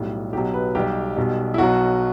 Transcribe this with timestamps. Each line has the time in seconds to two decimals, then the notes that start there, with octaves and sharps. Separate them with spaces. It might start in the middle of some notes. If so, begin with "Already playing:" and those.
Already playing: B1 A2 G3
0.33 B1 B2 F#3 G4
0.54 B4
0.75 B1 B2 G3 G4
1.16 B1 B2 G3
1.54 E4
1.58 B1 B2 F#3 F#4